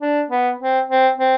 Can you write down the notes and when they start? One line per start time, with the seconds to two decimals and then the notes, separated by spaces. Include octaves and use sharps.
0.01 D4
0.30 B3
0.60 C4
0.89 C4
1.18 C4